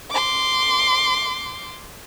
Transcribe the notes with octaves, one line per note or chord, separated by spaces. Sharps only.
C6 D6